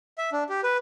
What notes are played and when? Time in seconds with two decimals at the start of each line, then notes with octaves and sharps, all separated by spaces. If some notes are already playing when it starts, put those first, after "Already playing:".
0.18 E5
0.32 D4
0.49 G4
0.64 B4